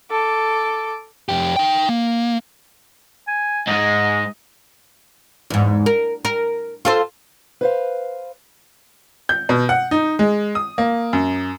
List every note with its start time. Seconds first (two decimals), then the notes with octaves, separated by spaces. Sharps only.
0.11 A4 D6
1.29 F2 G4
1.56 D#4 G5
1.89 A#3
3.27 G#5
3.67 G#2 G#3 D#5
5.50 E2 G#2
5.86 A#4
6.25 A#4
6.85 F4 A4 C5
7.61 B4 C5 F5
9.29 G6
9.49 B2
9.69 F#5
9.91 D#4
10.19 G#3
10.55 D#6
10.78 A#3
11.13 F#2